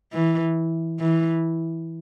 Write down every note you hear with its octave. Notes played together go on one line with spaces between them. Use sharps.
E3
E3